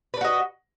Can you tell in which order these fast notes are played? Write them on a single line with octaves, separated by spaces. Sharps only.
B4 D4 F#4 D#5